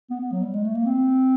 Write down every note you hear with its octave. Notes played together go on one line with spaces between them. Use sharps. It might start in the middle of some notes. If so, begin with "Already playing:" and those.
B3
B3
F#3
G3
G#3
A3
A#3
C4